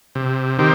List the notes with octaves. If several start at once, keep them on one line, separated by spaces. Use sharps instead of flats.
C3
D#3 C4 G4